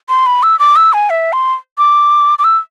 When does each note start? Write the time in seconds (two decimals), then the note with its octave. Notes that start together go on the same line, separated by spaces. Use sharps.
0.09 C6
0.26 B5
0.43 E6
0.59 D6
0.76 E6
0.93 G#5
1.10 E5
1.33 C6
1.78 D6
2.39 D6
2.44 E6